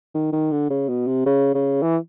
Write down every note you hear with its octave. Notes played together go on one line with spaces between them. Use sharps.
D#3
D#3
D3
C#3
B2
C3
C#3
C#3
E3